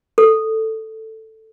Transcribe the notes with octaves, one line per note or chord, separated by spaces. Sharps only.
A4